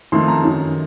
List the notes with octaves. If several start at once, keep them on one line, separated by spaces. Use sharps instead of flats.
F2 D#3 A3 C6
A#5
F#2 D#3 F#3